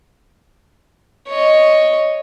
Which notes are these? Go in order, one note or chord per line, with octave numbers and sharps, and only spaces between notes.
C#5 D#5